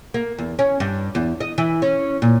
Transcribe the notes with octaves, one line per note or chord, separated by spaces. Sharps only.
A#3
E2
C#4
G2
E2
D#5
E3
C#4
A#2